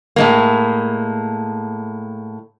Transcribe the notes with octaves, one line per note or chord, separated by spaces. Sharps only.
A2 G#3 A#3